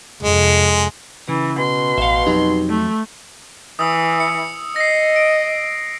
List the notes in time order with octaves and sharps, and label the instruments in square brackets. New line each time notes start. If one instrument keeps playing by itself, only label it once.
[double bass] F2 C3 [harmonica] G#3
[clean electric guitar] C#3 [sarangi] E3
[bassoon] B2 [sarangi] C6
[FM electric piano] A1 B4 C#7 [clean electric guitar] E5 F5
[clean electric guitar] F2 F#3 [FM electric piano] D#4 G4
[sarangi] A3
[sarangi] E3 [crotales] D#6 E6
[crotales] C#7
[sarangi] D#5 [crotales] A#6 C7
[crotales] D7